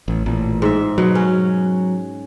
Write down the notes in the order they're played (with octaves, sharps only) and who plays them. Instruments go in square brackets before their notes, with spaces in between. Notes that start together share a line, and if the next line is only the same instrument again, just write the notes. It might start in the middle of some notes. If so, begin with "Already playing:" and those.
[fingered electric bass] A1
A1 A#2
[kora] G#2 E5
[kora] B2 [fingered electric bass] F#3
[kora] C#4